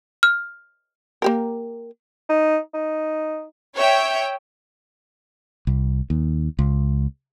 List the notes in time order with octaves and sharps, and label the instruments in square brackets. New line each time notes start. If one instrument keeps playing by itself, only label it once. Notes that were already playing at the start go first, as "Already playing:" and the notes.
[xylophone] F6
[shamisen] A#3 G4 A#4
[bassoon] D#4
D#4
[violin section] C#5 E5 G5
[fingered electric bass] C2
D#2
C#2